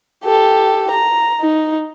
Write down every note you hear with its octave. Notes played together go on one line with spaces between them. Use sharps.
G4 A4
A#5
D#4